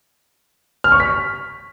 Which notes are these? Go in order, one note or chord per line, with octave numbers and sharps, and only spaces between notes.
F6
C#6
B6